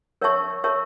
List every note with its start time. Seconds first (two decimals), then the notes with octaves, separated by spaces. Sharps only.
0.22 A#4 C#5 E5 A5 C#6
0.64 A#4 C#5 E5 A5 C#6